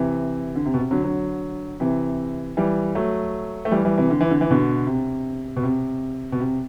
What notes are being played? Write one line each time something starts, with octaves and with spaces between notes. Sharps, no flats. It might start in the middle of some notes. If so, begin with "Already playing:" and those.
Already playing: C3 E3
D3
C3
B2
C3
D3 F#3
D3 F#3
C3 E3
E3 G3
F#3 A3
A3
E3 G3
E3 G3
C3 E3
D3
E3
D3
E3
B2 D3
C3
B2
C3
B2
C3